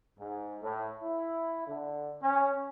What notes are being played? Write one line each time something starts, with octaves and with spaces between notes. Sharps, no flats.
G#2
A2
E4
D3
C#4